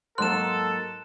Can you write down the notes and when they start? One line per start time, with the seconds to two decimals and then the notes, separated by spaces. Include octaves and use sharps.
0.18 G#2 F#3 A#3 A4 C6 D#6 F#6 E7